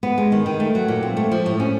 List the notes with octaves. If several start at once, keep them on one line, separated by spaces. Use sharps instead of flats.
B3
G#3
D#3
D#3
A3
F#3
A#2
C4
A3
F3
A2
C#4